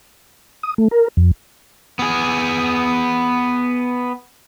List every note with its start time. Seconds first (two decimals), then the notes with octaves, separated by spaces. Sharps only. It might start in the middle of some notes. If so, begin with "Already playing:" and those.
0.63 D#6
0.78 A3
0.91 A#4
1.17 F2
1.99 B3 G#4